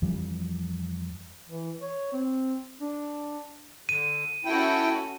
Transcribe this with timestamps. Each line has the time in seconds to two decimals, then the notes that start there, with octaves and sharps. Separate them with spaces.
0.02 F2 E3 F3 G3
1.49 E3
1.81 C#5
2.13 C4
2.81 D4
3.89 D3 D#7
4.45 C#4 E4 F#4 A4 G5